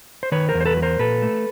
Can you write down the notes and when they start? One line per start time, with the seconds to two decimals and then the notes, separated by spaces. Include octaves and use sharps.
0.23 C5
0.32 D#3 B4 C#5
0.49 A#4 C5
0.54 E2
0.61 C5
0.65 A4 B4
0.77 F#3
0.82 A#4 C5
0.99 A#2 A4 B4
1.22 A3